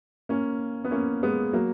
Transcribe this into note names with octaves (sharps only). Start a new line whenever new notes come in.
A#3 C#4
B3
A#3 C#4
G#3 B3
F#3 A#3